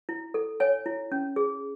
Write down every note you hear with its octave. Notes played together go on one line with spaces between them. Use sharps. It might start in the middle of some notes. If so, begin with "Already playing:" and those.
E4
A4
C#5 G#5
E4
C#4
G#4